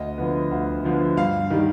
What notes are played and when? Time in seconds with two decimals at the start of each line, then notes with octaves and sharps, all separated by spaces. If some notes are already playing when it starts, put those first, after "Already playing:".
Already playing: D2 D#5
0.18 D3 F3 B3
0.51 D2
0.84 D3 F3 B3
1.17 G2 F5
1.50 D#3 G3